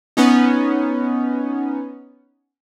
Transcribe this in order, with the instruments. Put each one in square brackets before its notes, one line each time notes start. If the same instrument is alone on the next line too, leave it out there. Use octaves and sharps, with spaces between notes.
[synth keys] B3 C#4 D#4